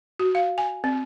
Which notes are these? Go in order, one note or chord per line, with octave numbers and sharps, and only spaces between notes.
F#4
F5
G#5
C4